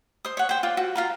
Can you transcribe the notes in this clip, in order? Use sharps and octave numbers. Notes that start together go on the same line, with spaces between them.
C5 D#6
C#5 F#5
C5 G5
F4 D5
F#4
F4 F5 A#5